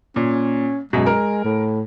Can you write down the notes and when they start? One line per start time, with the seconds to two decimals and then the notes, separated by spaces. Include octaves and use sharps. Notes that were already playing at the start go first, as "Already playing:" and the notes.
0.16 A#2 C#4
0.93 F#2 B2 G#3
1.06 A#4
1.45 A2